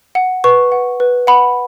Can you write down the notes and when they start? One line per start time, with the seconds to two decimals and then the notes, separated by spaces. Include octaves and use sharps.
0.15 F#5
0.44 B4 C#6
0.72 F#5
1.00 B4
1.27 F#5 B5